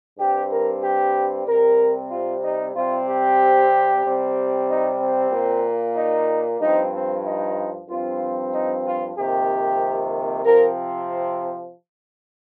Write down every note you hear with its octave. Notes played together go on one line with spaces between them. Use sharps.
G2 G3 C4 G4
A#4
G4
C3 G3 C4 A#4
F4
D#4
C3 G3 C4 F4
G4
C3 G3 C4
D#4
C4
A#2 A#3
D#4
G2 F3 C4 D#4
C4
D#4
G2 F3 C4 F4
D#4
F4
F2 C3 D#3 A#3 G4
C3 F3 C4 A#4